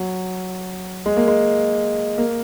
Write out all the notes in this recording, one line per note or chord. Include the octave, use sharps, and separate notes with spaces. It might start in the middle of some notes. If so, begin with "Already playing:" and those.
Already playing: F#3
G#3
A#3
G#3
A#3